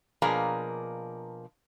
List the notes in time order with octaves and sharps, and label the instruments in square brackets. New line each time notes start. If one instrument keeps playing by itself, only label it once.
[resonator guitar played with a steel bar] B2 F3 A#3 D4 G#4 A#4